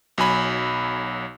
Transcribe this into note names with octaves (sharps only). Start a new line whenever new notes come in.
B1 F#3 G#5 B5